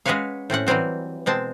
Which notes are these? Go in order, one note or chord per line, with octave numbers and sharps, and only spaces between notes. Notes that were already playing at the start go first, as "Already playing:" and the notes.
G#3 C#4 F#4 B4 C#5 F5
A2 C4 C#4 F#5
E3 F#3 G3 C4 F#4
B2 G#3 C4 A5